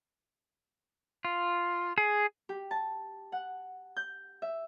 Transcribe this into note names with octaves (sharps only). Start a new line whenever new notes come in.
F4
G#4
G4
A5
F#5
G6
E5